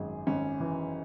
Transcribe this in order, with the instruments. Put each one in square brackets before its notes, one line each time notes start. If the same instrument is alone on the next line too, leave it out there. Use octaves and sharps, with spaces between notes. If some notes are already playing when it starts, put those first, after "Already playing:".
Already playing: [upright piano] G#1 F#2 G#4
G#1 C#4
E3